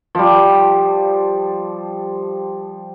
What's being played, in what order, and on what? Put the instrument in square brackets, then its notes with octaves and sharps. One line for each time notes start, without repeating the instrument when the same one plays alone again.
[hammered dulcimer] F3 G3